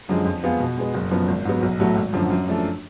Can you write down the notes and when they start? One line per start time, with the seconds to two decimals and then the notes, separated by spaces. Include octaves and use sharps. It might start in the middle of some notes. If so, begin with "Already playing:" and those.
0.09 F#2 D3 F3 G#3
0.25 F2
0.43 F3 B3 F4 G#4
0.60 B2
0.77 G#3 B3
0.94 F#1
1.11 F#2 F3 B3
1.28 G#1
1.45 G#2 F#3 B3
1.62 B1
1.79 A2 F#3 A3
1.97 G#1
2.13 F#2 D3 F3
2.30 F#2
2.48 F3 A3 D4